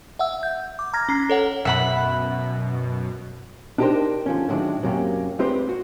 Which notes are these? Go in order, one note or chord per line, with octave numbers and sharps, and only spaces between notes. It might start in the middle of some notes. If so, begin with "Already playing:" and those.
E5 F#5 E6
G6
D6
A#5 F6 G#6 A#6
C#4 A#5 C7
A4 C#5 F#5
F#2 B2 E5 F#5 B5
D4 D#4 G4 G#4 A#4 C5
D3 F3 C#4
A2 D#3 F#3 G#3 D4 F#4
F#2 C3 F#3 A#3 C#4 G4
G#3 C4 G4 B4 C5 D5
F#4